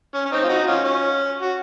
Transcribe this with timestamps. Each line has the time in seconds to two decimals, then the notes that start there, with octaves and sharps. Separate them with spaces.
0.14 C#4
0.25 C#4
0.32 C4 D#4
0.44 F4
0.49 D#4 F#4
0.66 C#4 F4
0.84 C#4
1.42 F#4